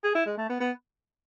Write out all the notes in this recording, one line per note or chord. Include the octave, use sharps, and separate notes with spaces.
G#4
E4
G#3
A3
B3
B3